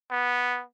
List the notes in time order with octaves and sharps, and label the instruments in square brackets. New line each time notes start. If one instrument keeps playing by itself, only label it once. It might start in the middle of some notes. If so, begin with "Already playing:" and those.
[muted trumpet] B3